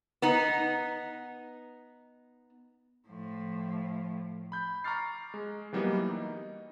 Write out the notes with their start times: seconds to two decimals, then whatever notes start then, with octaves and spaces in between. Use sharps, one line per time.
0.22 B3 D#4
3.09 A2 F3
4.52 B5 G6
4.84 A#5 C#6 D6 F6 A6 C7
5.34 G#3
5.73 E3 F#3 G3 A#3 B3 D#4
6.10 D#4